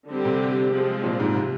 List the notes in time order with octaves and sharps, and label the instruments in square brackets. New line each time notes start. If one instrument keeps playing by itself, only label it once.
[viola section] D3 G3 C4 G4
[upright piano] C3
[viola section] F3 G#3 C4
[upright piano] A#2
G#2
C3